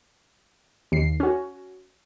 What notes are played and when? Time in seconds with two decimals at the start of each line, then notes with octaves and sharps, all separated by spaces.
0.92 D#2 C7
1.20 C#4 F#4